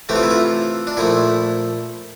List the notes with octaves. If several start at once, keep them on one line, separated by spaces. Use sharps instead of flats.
C3 E3 A3 G4
F4
E4
F4
D4
A#2 F3 A3 E4